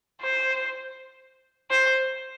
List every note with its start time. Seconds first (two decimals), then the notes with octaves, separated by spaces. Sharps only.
0.21 C5
1.70 C5